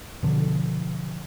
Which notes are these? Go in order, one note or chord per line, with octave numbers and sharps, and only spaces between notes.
B2 D3 F3